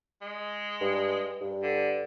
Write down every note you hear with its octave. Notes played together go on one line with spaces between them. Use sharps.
G#3
G2
G2
D3